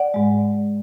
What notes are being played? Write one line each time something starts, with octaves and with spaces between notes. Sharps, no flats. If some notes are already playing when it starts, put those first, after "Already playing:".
Already playing: D5 F#5
G#2 G#3